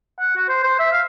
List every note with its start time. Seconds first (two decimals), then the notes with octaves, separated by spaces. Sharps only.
0.20 F#5
0.36 F#4
0.49 C5
0.64 C5
0.79 E5
0.92 F5